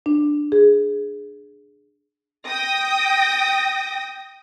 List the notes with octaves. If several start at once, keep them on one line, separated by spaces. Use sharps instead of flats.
D4
G#4
G5 D#6 A#6